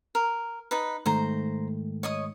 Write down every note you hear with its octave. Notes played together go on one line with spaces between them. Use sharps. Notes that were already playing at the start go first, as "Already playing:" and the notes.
A#4
D#4 B4
G#2 D#3 A3 C5 A#5
C#5 D#5 D#6